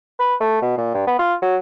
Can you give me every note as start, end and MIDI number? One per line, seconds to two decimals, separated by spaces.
0.19 0.35 71
0.40 0.61 57
0.62 0.76 47
0.78 0.92 46
0.94 1.04 43
1.07 1.18 59
1.19 1.34 65
1.42 1.57 54